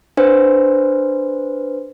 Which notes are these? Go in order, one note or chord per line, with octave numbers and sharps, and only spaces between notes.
D4 B4 C5